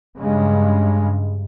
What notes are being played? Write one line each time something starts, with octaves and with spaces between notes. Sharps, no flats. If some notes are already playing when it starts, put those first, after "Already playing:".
G2 C#3 G#3